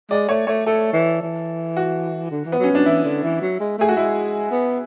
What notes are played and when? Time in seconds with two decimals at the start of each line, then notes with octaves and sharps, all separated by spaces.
0.11 G#3 D5
0.29 A3 C#5
0.47 A3 C#5
0.66 A3 A4
0.93 E3
1.21 E3
1.77 F#4
2.31 D3
2.45 E3
2.52 B3
2.59 F#3
2.64 C#4
2.72 F#3 D4
2.86 E3 E4
3.04 D3
3.23 E3
3.41 F#3
3.60 G#3
3.78 A3 G#4
3.89 F#4
3.96 G#3 E4
4.51 B3